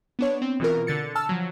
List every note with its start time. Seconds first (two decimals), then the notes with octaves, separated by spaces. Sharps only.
0.19 B3 D4 C#5
0.42 C4
0.60 B2 E3 F4 A#4
0.87 D3 A6 C#7
1.15 A5 E6 F6
1.29 F3 F#3